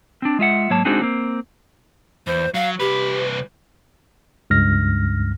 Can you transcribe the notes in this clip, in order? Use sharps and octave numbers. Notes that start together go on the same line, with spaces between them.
C4 D4
G#3 F4 E5 F#5
G#2 F#3 A#3 C#5 A5
G#3 C4 D4 D#4 F#4 G#4
A#3 C4
E2 C5
F#3 F5
C2 G4 B4
C#2 G2 F6 A#6